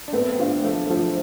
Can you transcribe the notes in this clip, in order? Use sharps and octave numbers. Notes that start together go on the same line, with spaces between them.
D4
A3 B3 C4
D4 F4 C5 F5
F3 A3 B3
F3 A3 D4 F4 C5 F5